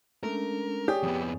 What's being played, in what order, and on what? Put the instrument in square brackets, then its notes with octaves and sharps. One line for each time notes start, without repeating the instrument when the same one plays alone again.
[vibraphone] G#3 C#4 D4 [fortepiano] A3 [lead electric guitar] A#4
[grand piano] G4 [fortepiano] G#4 C#5 D5 [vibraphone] D#6
[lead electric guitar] F2 B3